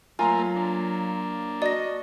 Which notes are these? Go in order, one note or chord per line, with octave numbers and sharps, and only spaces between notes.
F#3 A3 A#3 F4 A#4 G#5 A#5 C6
A#3 D4
F#4 D5 D#5 A#6